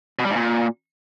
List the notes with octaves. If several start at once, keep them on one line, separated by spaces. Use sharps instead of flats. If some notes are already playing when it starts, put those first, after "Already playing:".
B2
G3
G#2
A#2